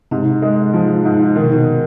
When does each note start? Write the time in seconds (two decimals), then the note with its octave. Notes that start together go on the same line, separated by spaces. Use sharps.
0.11 G#2 C3
0.42 G#3
0.74 F3
1.05 G#2
1.36 B2 D#3
1.44 C3
1.53 B2